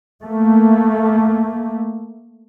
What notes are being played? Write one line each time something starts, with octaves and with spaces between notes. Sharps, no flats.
A3 A#3